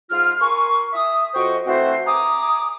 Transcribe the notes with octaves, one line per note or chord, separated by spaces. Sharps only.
G#2 F4 F6
A#4 G#5 C6 C#6
E5 D#6
F2 F#4 C5 D#5 G5 C#6
E3 A3 C4 E4 F#4 C5
E5 G#5 A#5 D6 D#6